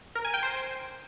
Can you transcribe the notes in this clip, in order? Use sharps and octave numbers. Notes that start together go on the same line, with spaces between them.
A#4
G#5
G5
C5